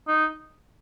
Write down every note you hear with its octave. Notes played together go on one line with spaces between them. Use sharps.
D#4